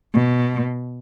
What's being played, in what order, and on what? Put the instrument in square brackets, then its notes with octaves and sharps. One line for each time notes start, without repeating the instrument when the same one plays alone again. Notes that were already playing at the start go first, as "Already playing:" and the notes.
[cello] B2